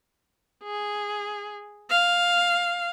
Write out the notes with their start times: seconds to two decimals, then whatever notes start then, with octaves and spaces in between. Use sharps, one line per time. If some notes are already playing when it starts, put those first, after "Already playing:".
0.64 G#4
1.90 F5